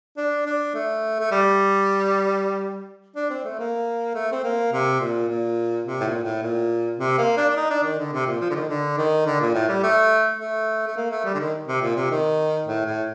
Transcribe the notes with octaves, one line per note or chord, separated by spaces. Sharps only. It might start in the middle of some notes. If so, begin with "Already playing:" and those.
D4
D4
A3
A3
G3
D4
C4
A3
A#3
A3
C4
A#3
C3
A#2
A#2
C3
A2
A#2
A2
A#2
C3
A#3
D4
D4
D#4
D4
D#3
D3
C3
A#2
F3
D3
D#3
D3
D#3
D3
A#2
A2
G3
A3
A3
A3
A#3
A3
G3
D3
D#3
C3
A#2
C3
D#3
A2
A2